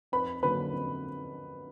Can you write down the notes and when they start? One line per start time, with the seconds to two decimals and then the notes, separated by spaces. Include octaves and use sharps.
0.12 F2 B4 B5
0.42 D3 F#3 A#3 B4 B5
0.73 F2